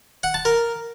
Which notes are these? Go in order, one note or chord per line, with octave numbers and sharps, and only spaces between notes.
F#5
A5
A#4